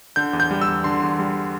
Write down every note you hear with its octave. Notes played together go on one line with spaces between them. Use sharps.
D3 G6
E2
G6
G3
E6
E2
D3 C6
E2
G3